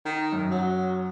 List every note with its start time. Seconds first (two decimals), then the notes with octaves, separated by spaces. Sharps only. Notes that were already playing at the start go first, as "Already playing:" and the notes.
0.05 D#3
0.32 F#2
0.51 F#3